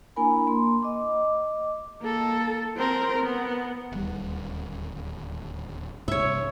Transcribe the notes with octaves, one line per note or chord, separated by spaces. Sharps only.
A#3 D4 E4 A#4 G#5 B5
A#3 C6
D#5 D6
A#3 A4
C4 A#4
B3
D1 D#2 G3
C2 G2 C3 C#5 E5